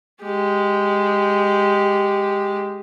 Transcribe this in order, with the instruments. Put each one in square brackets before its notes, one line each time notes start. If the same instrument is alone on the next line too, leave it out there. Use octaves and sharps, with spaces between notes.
[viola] G#3 G4